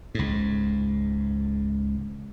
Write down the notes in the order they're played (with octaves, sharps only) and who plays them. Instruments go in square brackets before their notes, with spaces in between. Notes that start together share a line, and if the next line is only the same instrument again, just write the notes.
[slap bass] C#2 G#2